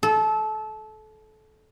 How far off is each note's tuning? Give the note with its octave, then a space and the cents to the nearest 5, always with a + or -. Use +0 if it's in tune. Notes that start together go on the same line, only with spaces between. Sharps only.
A4 -25